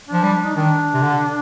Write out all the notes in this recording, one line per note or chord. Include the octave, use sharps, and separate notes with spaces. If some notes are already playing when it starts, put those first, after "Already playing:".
F3 D4
G3
D#4
D#3 D4
C3
D3